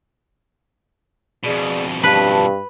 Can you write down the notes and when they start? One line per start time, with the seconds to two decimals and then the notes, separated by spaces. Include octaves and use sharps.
1.44 F2 B2 G#4 D5
2.03 G2 B4 A5